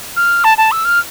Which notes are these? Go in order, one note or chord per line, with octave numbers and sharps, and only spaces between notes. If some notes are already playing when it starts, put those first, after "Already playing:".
F6
A5
A5
E6
F6